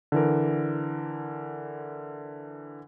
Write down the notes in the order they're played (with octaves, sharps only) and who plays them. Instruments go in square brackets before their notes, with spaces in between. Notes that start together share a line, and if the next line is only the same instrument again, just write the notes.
[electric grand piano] D3 E3 A#4